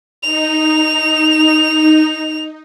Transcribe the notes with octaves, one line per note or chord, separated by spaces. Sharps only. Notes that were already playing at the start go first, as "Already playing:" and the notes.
D#4 F7